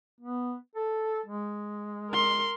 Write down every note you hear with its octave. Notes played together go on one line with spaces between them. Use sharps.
B3
A4
G#3
A#4 C6